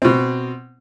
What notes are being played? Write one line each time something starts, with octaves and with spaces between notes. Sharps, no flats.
B2 C4